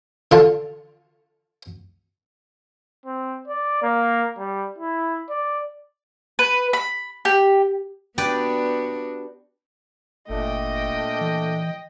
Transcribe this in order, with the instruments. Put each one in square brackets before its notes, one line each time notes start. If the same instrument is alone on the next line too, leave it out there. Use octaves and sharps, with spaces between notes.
[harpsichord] D3 F4 A5
[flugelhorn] C4
D5
A#3
G3
E4
D5
[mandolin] B4
B5
G4
[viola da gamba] B3 D4 F#4 [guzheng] G4 B4 D5
[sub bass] G1 [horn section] A#2 A3 D4 [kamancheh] D#5 G5
[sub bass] E3